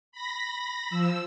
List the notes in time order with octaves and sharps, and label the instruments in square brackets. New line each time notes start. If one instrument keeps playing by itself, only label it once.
[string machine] B5 A#6
F3 E6